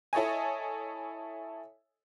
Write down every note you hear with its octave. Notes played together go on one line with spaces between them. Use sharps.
E4 A4 C#5 D#5 G#5